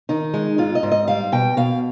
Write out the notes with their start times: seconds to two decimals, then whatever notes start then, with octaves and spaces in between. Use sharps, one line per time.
0.09 D#3 D#4
0.34 G#3
0.58 G#2 F4
0.75 D#5
0.83 G#2
0.92 D#5
1.08 G3 F5
1.32 B2 G5
1.57 B2 F5